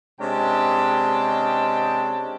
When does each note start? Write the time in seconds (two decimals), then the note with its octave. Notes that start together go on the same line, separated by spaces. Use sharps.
0.20 C3 G#3 C#4 D4 G5 A5